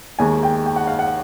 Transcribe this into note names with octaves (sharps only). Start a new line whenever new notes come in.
D#2 D#3 G#3 G#5
G5
G5
F#5
F5
F#5